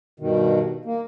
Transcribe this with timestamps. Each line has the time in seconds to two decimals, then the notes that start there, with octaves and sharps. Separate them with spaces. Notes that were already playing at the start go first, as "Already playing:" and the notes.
0.20 G2 B2 D#3
0.85 A#3